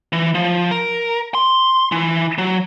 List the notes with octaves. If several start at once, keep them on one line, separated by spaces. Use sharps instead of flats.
E3
F3
A#4
C6
E3
F#3